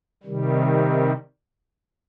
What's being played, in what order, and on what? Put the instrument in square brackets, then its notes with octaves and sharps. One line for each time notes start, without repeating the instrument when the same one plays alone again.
[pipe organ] C3 D#3 G3